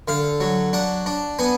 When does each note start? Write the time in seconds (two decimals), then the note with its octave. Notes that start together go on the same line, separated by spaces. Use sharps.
0.08 D3 F5
0.40 F#3
0.73 D4 F#5
1.06 D4
1.39 B3 G#5